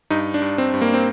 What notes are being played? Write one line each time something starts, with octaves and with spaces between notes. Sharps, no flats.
G2 D#4
D4
G2
C4
G2
A#3
C4